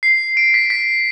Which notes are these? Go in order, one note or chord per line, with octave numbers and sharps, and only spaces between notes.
C7
D7
B6
B6